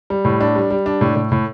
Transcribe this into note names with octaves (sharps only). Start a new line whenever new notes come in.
G3
A2
D4
G3
G3
D4
A2
A2
A2